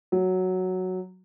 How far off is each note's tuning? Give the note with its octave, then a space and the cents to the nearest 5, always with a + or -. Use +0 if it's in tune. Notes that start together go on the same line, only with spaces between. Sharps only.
F#3 +0